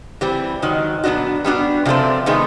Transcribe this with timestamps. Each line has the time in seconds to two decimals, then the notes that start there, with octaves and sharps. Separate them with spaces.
0.21 E3 G3 C4
0.62 G#2 D#3 F#3
1.04 A#2 F#3 B3 D4 F#4
1.45 G3 B3 D4 F#4
1.85 C3 F3 A3 C4
2.26 C3 D#3 G#3 B3